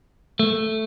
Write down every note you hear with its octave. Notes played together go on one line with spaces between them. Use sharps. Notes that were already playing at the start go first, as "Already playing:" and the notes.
A3